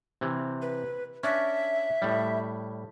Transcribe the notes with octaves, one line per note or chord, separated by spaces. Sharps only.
C3 E3
B4
C#4 D4 E5
A2 G3